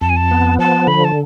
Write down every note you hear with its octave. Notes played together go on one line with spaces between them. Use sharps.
F2 A5
G#5
A5
B3
F3 A5
D3 B5
A5